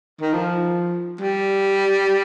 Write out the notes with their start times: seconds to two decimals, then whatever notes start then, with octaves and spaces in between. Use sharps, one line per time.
0.21 D#3
0.33 F3
1.21 G3